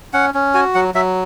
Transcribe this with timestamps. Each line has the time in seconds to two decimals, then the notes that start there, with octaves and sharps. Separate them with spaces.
0.13 C#4 F#5
0.34 C#4
0.54 F#4 G#5
0.75 F#3 F#5
0.94 F#3 E5